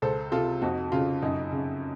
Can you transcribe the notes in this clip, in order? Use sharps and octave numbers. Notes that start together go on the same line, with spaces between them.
C#2 A4 C5
C3 F4 A4
F2 D#4 F#4
C#3 F4
F#2 D#4
C#3